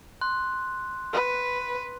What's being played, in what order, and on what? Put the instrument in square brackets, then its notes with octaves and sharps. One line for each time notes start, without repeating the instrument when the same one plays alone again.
[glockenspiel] C6 F#6
[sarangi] B4